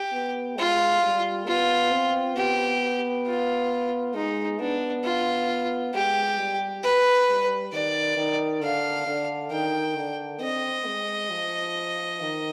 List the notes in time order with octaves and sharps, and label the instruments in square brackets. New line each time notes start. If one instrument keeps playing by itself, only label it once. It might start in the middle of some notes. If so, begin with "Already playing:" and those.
Already playing: [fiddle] G4
[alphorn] B3
[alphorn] G#3 [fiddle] F4
[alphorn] G3
[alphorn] B3 [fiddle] F4
[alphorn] C4
[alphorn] B3 [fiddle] G4
[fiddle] F4
[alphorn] G#3 [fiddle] D#4
[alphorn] B3 [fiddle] D4
[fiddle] F4
[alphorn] G#3 [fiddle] G4
[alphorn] G3
[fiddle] B4
[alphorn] G3
[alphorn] D#3 [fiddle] D5
[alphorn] D#3
[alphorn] D3 [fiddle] F5
[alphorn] D3
[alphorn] D#3 [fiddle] G5
[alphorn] D3
[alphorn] C4 [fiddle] D#5
[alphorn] G#3
F3
D#3